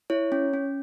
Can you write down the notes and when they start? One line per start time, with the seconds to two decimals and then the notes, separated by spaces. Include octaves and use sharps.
0.10 E4 C#5
0.32 C#4
0.54 C#4